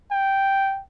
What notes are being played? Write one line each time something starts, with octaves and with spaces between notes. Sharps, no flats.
G5